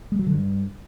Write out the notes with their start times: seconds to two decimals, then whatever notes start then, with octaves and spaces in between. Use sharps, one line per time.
0.12 G#3
0.19 F#3
0.27 D3
0.34 G2